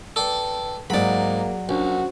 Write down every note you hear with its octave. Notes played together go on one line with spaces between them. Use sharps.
A4 B4 D5 G5 A5
G#2 F#3 A#3 G#4 D5 B5
A#1 C#4 D4 F#4 C5